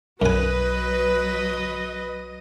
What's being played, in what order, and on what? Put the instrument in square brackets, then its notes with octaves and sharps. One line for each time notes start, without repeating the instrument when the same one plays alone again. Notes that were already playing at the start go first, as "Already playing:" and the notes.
[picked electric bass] B1 [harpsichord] F#2 G#5 [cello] F#3 D#5 [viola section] B4